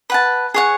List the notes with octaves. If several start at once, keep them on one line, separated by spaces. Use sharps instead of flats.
B4 F#5 A5
G#4 C#5 F#5